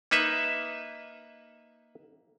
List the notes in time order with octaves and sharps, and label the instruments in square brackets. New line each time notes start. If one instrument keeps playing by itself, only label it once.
[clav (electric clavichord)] A#3 D#4 B4 E5